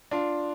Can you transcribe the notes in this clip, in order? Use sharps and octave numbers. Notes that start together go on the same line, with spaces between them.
D4 F4